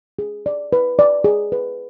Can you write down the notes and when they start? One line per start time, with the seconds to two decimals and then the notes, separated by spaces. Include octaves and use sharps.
0.19 G#4
0.46 D5
0.73 B4
0.99 D5
1.24 G#4
1.52 B4